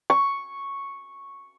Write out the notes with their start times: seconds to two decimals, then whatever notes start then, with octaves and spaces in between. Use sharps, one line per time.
0.10 C#6